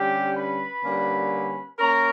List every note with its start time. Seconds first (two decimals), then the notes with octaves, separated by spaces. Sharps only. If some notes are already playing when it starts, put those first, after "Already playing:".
Already playing: D3 G3 C#4 G4 G5
0.36 B4 B5
0.84 D3 G3 A#3 C#4
1.79 A#3 C#4 A#4 A#5